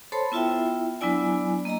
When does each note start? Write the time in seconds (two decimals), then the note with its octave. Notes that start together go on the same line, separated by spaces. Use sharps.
0.12 A4 C5 C#5 A5 B5 C6
0.32 B3 E4 F4 E5 G5
1.01 F#3 B3 D4 E4 D5 G#5
1.65 A#3 D#5 A#5